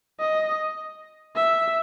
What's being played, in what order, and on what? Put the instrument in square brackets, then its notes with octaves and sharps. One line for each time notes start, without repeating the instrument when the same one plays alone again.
[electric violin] D#5
E5